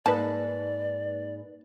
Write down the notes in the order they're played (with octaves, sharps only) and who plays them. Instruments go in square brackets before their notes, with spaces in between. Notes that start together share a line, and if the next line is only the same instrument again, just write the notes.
[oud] G#2 [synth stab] A#3 D#4 B4 [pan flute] D5 [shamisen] A5